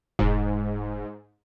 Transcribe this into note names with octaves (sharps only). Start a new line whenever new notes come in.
E1 G#2